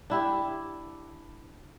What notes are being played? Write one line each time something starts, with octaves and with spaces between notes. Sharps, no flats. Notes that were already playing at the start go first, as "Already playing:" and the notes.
D4 E4 G4